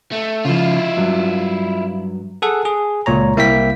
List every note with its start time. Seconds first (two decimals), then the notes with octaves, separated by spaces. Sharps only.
0.12 A3
0.45 C#3 F3 E4 F4
0.97 G2 F#3
2.42 G#4 A4 F#5
2.65 G#4
3.06 C#2 A#2 C#5 A#5
3.36 C2 A#3 E4 E5 G5 B6